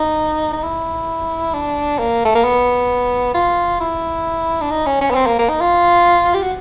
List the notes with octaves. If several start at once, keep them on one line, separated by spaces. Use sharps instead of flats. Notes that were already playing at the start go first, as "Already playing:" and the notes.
Already playing: D#4
D#4
E4
D4
A#3
A3
A#3
B3
F4
E4
D4
D#4
C#4
C#4
B3
C4
A#3
A#3
D#4
F4
G4
F#4